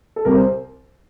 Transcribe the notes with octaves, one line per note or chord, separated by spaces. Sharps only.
A4
C2 C3 G3 C4 A#4
C5